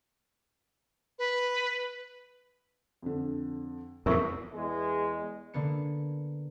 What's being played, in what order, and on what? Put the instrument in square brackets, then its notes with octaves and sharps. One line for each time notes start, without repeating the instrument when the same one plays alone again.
[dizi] B4
[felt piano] F2 D3
[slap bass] E2 G#2 [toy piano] A#4 E5 C#6
[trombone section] E2 G#3
[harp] D3 A#3 B3 C#7